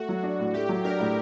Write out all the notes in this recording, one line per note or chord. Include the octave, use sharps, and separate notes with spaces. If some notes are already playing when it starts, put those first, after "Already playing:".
Already playing: A3 F#4
F#3
D4
A2
A3 G4
F#3
D4 A#4
A2